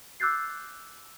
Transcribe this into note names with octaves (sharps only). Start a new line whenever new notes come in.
D6 E6 F#6 G6 A6 C7